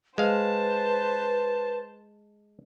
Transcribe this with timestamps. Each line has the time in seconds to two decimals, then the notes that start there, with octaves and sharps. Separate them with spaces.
0.18 G#3 B4 C5 F5 A5